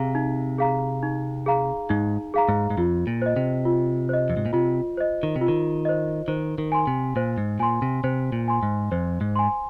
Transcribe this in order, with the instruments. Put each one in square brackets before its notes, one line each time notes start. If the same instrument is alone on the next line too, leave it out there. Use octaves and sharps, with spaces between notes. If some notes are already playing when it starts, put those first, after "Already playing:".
Already playing: [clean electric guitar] C3 [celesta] G#4 F5 A#5
[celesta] D#4
G#4 F5 A#5
D#4
G#4 F5 A#5
[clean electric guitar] G#2 [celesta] D#4
[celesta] G#4 F5 A#5
[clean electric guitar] G#2
G#2
[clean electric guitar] F2 [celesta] F4
[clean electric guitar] A#2
[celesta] C5 D#5
[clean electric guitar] C3
[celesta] F4
C5 D#5
[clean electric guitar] F2
G#2
A#2
[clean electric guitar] C3 [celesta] F4
[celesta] C5 D#5
[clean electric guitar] D#3
C3
[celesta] F4
[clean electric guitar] D#3
[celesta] C5 D#5
[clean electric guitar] D#3 [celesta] C5
[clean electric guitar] D#3
[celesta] G#5 C6
[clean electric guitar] C3
[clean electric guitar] A#2 [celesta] C5
[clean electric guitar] G#2
[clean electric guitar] A#2 [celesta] G#5 C6
[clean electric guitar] C3
[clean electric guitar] C3 [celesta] C5
[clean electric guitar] A#2
[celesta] G#5 C6
[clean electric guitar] G#2
[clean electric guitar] F2 [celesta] C5
[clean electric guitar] G#2
[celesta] G#5 C6